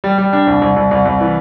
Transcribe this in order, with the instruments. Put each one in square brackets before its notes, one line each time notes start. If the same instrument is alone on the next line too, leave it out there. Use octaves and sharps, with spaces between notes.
[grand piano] G3
G3
D4
C2
C2
C2
C2
C2
E3